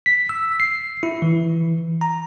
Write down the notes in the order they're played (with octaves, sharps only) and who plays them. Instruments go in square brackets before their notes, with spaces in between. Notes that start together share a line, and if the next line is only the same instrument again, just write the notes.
[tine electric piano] B6
E6
C7
E4
E3
A#5